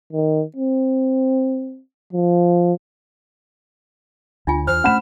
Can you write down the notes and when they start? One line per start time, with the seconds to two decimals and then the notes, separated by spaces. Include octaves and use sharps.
0.13 D#3
0.56 C4
2.13 F3
4.47 D2 D4 F4 G#5
4.67 E2 C5 F6
4.84 A3 C#4 F#5 B5 E7